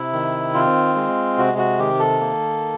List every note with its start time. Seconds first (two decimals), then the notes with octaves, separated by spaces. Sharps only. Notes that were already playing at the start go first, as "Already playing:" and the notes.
Already playing: C3 E4
0.13 D#3
0.54 C4 F4
0.96 G#3
1.38 C3 F#4
1.58 F#4
1.79 D#3 G4
2.00 A4
2.20 A#3